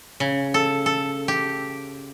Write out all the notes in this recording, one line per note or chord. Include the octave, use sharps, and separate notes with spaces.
C#3
A4
A4
G4